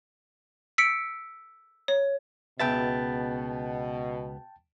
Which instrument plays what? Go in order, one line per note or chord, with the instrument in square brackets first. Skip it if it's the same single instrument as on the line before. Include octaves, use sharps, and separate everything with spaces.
[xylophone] E6 B6 C#7 D7
C#5
[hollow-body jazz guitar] C#2 B3 E5 [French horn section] B2 [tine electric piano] G5 A5 A6